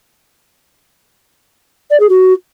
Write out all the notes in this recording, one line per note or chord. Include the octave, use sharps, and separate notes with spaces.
D5
G#4
F#4